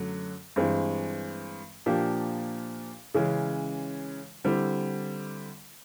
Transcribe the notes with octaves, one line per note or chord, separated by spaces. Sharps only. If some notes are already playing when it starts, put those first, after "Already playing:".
Already playing: F#2 D3 F#3 A3
G2 E3 G#3 C4
A#2 F3 A#3 D4 G4
C#3 E3 G#3 C#4
D3 G3 C4 E4